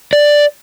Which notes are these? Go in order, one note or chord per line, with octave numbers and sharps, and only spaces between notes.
D5